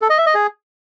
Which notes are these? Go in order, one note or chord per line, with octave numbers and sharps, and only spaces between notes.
A4
D#5
E5
D#5
G#4